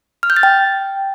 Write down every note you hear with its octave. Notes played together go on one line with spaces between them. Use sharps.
F6
G6
A6
G5